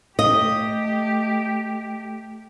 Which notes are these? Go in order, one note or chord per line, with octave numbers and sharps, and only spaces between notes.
A3 G4 D#5